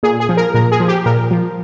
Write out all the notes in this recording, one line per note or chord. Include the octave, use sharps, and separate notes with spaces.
A#2 G#4
G#4
F3
A#4
A#2 A#4
G#4
F3
G4
A#2 A#4
F3